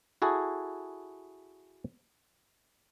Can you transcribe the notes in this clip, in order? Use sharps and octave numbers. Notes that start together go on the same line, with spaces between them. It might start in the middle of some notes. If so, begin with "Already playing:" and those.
E4 F#4 G#4 A4